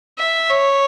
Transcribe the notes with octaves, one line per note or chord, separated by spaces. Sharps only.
E5
C#5